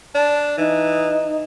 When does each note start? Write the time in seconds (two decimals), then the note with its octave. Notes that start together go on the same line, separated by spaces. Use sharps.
0.15 D4 A5
0.58 E3 D#4